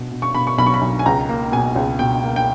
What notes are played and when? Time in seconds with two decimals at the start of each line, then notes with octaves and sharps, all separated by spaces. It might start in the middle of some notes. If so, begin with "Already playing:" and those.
Already playing: B2 B3
0.12 B2
0.22 C#6
0.34 B2 B5
0.47 C#6
0.58 B1 B5
0.66 C#6
0.74 B5
0.81 B1
0.99 G#5
1.06 C#2 A#5
1.29 A#3
1.52 B2 G#5
1.76 C#2
1.99 B2 G5
2.23 A#3
2.36 G5